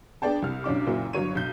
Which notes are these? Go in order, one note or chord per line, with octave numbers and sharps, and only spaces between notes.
B3 D4 G#4 D5 G5 A5
C2 F6
B1 C#4 D4 D6
F#1 A#2 F#3 E4
G1 F#3 C#5 D#7
B1 G6